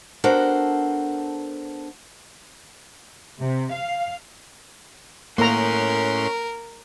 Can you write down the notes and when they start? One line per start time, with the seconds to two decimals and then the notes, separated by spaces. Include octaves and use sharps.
0.24 B3 D4 F#4 A4 A#4 C5
3.39 C3
3.72 F5
5.38 A2 A#3 C#4 F#4 A#4 A#5 C6